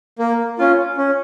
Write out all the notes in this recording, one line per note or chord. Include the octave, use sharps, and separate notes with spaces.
A#3
C#4 F4
C#4